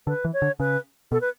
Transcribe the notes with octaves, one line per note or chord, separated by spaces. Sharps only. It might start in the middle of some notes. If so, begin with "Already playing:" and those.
D3 B4
E3
C#5
D3
C#3 B4
B2 A4
B4